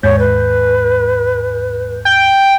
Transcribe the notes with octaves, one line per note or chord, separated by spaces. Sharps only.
D#2 G#2 C#5 G6
B4
G5